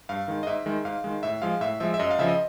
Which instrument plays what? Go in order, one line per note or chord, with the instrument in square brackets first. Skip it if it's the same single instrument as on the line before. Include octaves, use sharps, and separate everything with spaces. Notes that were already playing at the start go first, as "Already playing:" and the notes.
[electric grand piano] G2 F5
D#3 G#3
D#5
G#2 E5
D#3 G#3
G#2 F5
D#3 G#3
A2 E5
F3 G#3 F5
A2 E5
F3 G#3 E5
E5
F#2 D#5
F5
C#3 F3 E5
D#5